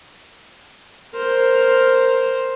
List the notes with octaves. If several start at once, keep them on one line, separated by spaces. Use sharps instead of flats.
A#4 C5